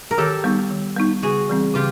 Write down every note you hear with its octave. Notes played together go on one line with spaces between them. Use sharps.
A#4
D#3 G4 A4
G3 B3 D#4
D#3
G3 B3 D#4
C#3 F#4 G#4
E3 G3 C4
C#3 F4 G4